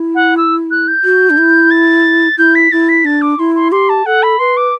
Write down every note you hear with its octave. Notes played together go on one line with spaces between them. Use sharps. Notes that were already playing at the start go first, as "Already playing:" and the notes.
Already playing: E4
F#5
E6
F#6
G6
F#4
D4
E4
A6
E4 G6
B6
E4 A6
B6
D4 A6
D6
E4 C6
C6
G4 C6
A5
A4 F#5
B5
B4 C6
D6